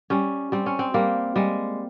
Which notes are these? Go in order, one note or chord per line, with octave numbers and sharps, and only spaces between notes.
G3 C#4
G3 C4
C#4
C4
G3 A#3
G3 G#3